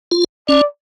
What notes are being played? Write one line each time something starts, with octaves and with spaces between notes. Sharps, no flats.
F4
C#4 D5